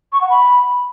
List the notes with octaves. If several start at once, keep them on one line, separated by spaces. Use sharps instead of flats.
C#6
F#5
B5